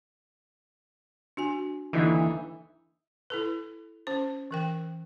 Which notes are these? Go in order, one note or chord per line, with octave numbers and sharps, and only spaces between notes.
D4 F#4 G#5
D#2 D3 E3 D#4 E4 E5
E4 A4 B4
C#4 C5
E3 A#4 G5